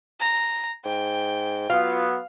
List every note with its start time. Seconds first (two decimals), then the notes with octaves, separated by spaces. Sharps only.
0.20 A#5
0.85 G#2 G5
1.70 F#3 B3 F4 F5